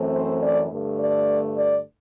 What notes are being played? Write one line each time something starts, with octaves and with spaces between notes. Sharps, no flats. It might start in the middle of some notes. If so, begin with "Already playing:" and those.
Already playing: F#2 E3 A3 C4
C5
D5
G2 D3 A3
D5
D5